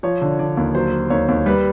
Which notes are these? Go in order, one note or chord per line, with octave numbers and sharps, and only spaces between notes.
F3 C#5
D3
D3 D5
D#2
F#3 C5
F#3
D#2 C#5
D#2
G3 B4